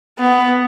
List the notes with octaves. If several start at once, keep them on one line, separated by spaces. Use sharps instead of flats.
B3